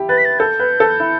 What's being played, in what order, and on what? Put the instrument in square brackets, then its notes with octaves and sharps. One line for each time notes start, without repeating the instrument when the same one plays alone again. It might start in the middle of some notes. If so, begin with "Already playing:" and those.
Already playing: [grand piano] E4 G4
[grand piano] B4 [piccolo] A6
[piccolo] B6
A6
[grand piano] A4 [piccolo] G6
[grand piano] B4
A4
E4